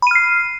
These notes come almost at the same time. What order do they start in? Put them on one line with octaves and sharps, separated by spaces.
B5 D#7 F6 C7